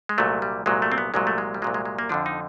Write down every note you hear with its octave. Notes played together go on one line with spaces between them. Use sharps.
G#3
C2 A#2 F#3 A3
G3
C2 A#2 F#3 G#3
A3
C4
B3
C2 A#2 F#3 G#3
A3
G#3
G3
C2 A#2 F#3 G#3
G#3
G#3
A#3
F2 D3 F3 D4
D#4